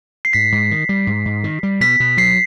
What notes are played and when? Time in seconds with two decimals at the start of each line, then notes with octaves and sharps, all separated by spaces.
0.25 C7
0.33 G#2 B6
0.52 G#2
0.71 D#3
0.89 G3
1.07 G#2
1.26 G#2
1.44 D#3
1.63 G3
1.81 B2 B6
2.00 B2
2.17 F#3 C7